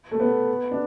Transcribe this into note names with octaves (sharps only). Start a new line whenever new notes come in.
A3
B3
D4